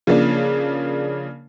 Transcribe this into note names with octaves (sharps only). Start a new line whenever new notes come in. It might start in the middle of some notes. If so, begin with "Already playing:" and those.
C#3 F3 A#3 D4